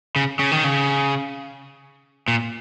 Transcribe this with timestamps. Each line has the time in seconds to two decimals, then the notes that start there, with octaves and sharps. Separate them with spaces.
0.16 C#3
0.39 C#3
0.51 D#3
0.64 C#3
2.28 A#2